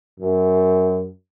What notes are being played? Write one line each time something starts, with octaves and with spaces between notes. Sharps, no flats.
F#2